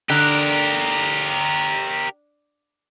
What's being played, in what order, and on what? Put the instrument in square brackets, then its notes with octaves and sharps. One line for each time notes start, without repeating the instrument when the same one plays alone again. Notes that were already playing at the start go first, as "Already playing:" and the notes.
[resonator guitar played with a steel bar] D3 [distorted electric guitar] G4 A#4